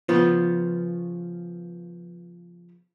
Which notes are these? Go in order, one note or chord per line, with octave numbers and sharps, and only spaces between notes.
C#3 F3 B3 F4